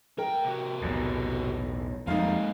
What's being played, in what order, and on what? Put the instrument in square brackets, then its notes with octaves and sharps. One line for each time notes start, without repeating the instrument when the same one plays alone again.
[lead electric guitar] A2 G5 [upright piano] A#4
[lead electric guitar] C3 F#4
[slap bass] B1 E2 A2
[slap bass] F2 G3 [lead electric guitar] G#3 A#3 [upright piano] D#4 F5